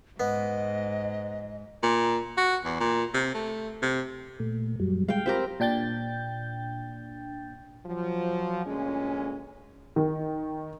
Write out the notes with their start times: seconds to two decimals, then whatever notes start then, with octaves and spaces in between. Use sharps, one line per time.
0.20 G#2 B3 D#5
1.83 A#2
2.37 F#4
2.65 E2
2.80 A#2
3.14 C3
3.35 A3
3.82 C3
4.40 A#2 A3
4.80 F#2 F#3 G3
5.08 G3 G#3 F5 G5
5.26 C4 F4 G4 A#4 B5
5.60 A#2 D4 G5 G6 A6
7.86 F3 F#3
8.66 D2 A#2 G#3 C#4
9.96 D#3